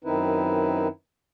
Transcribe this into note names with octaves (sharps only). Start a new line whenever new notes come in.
F#2 D#3 C4 D#4 E4 B4